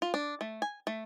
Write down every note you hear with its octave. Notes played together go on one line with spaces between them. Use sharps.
F4
D4
A3
G#5
A3